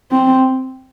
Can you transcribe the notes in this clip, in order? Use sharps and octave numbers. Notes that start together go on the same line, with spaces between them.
C4